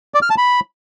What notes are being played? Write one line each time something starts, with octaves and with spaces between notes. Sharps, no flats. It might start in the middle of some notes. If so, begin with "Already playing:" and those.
D5
F6
A5
B5